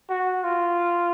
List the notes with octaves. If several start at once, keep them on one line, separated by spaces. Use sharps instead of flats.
F#4
F4